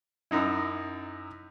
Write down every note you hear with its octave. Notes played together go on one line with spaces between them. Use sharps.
F#2 D#4 E4